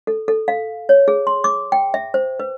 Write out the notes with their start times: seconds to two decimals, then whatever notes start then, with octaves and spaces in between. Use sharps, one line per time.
0.07 A4
0.28 A4
0.48 F5
0.89 C#5
1.08 G#4
1.27 C6
1.44 D6
1.72 G5
1.94 E5
2.14 C5
2.40 B4